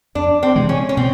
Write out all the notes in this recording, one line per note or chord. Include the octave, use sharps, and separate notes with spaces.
F2 D4
C4
C3 E3 G#3
C#4
C#4
B2 C4